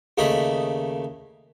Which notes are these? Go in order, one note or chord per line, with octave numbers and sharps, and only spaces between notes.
D#2 C#3 A3 D#5 B5